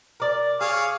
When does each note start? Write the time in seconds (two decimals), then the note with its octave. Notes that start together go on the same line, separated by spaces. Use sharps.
0.20 A#4 D5
0.61 G#4 C#5 D5 F5